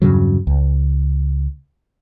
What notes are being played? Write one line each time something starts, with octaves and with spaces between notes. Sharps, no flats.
E2 G2 C#3 F#3
C#2